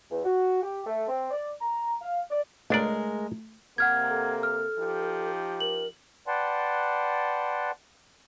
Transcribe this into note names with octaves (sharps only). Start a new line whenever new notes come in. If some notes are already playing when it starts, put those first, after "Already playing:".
E2
F#4
G4
A3
C4
D5
A#5
F5
D5
C#2 G#3 A3 D4 A#4 D5
C3 A#3 F#5 F6 G#6
A4
F6
F3 D#4 G4
A#4 F#7
B4 D5 F#5 G5 A5 C6